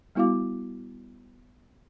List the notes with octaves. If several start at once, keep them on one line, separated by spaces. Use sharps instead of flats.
G3 B3 E4 F#4 F5 D6